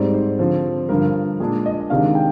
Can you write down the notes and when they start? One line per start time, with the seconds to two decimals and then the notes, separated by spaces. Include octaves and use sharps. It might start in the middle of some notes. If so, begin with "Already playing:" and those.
Already playing: G#2 G3 C4 D5
0.14 C5
0.39 D3 F3 C4
0.89 G2 D3 F3 A#4
1.40 A#2 G#3 D4 G#4
1.66 D#5
1.90 C3 D#3 G#3 D4 F5
2.15 G5